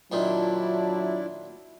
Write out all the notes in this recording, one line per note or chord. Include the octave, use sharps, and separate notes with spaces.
A#2 D#3 F#3 D4 E4 F4